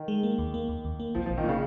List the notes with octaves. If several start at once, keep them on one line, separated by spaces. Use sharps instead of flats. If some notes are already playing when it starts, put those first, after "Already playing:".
Already playing: D#3
G#3
A#3
D#2
A#3
D#2
D#2
A#3
A#1 F3
A#1 F3
D#3
A#2
C#3